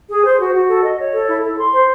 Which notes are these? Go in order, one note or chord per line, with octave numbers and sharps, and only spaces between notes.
G#4
C5
F#4
F#4
A4
D#5
C#5
A4
E4
A4
C6
C5